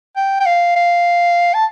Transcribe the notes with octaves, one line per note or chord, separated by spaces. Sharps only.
G5
G5
F5
F5
A5